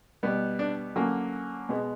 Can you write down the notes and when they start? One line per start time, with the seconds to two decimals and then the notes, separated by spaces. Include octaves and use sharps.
0.23 B2 G3 B3
0.59 D4
0.96 D3 F#3 A#3 C#4
1.69 B2 G#3 B3